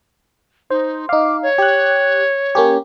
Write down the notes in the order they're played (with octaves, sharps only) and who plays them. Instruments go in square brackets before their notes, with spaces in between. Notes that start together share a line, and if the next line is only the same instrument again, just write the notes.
[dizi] D#4 [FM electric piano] C5
[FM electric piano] D#4 F5 [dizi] D6
[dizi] C#5
[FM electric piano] G4 F#6
A#3 C#4 G4